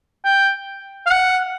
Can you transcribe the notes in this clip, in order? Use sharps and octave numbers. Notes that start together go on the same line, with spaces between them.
G5
F5
F#5